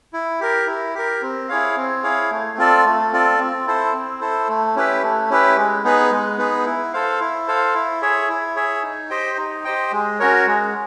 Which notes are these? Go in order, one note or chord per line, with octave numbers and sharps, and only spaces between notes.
E4
G4 A#4
E4
G4 A#4
C4
E4 G#4 C#5 F5
C4
E4 G#4 C#5 F5
A3
C4 F4 A4 D5
A3
C4 F4 A4 D5
C4
E4 A4 C5
C4
E4 A4 C5
A3
C#4 E4 G4 B4
A3
C#4 E4 G4 B4
G#3
B3 D#4 G#4 B4
G#3
B3 D#4 G#4 B4
E4
A4 C5 F5
E4
A4 C5 F5
E4
G#4 C#5 E5
E4
G#4 C#5 E5
D#4
G4 C5 D#5 G5
D#4
G4 C5 D#5 G5
G#3
C#4 F#4 A#4 C#5
G#3